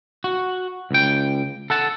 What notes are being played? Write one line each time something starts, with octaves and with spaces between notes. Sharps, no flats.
F#4
C#2 G5
A4 F#5 A5